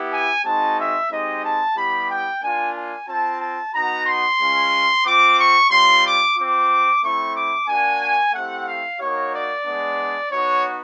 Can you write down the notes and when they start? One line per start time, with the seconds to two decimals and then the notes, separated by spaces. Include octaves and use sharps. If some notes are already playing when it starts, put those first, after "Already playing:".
Already playing: B3 E4 G4
0.12 G#5
0.45 G#3 C4 D#4 F#4 A5
0.78 E5
1.10 G#3 C4 D#4 G4 D#5
1.44 A5
1.76 G3 B3 E4 G4 B5
2.09 G5
2.42 A#3 D4 F4 G#5
2.75 G#5
3.08 C4 F4 A5
3.41 A5
3.73 B3 D#4 F#4 A#5
4.06 C6
4.39 G#3 C#4 F4
5.05 C4 F4 D6
5.38 C#6
5.71 G3 C4 F4 C6
6.04 D6
6.36 C4 F4 D6
7.03 A3 C4 E4 C#6
7.35 D6
7.68 A#3 D4 F#4 G#5
8.33 A3 C4 E4 G4 F#5
8.67 F5
8.99 A#3 D#4 F#4 C#5
9.33 D5
9.65 G#3 B3 D4
10.31 B3 D#4 F#4 C#5